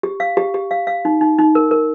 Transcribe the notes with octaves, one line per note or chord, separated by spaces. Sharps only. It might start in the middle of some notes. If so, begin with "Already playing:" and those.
G4
F5
G4
G4
F5
F5
D#4
D#4
D#4
A#4
A#4